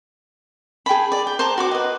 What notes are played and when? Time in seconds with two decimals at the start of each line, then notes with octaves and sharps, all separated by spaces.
0.86 G#4 G5 A5 B5
1.12 D5
1.27 G5
1.39 C5 A5 A#5 D6
1.58 F#4 D5 D6
1.71 B4 D#5